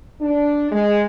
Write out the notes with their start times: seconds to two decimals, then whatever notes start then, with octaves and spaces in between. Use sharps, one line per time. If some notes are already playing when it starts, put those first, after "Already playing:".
0.21 D4
0.72 G#3